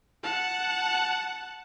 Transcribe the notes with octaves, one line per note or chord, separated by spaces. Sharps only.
F#5 A5